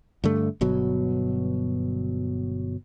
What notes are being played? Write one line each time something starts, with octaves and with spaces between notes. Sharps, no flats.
G2 D3 A3
G1 B2 F#3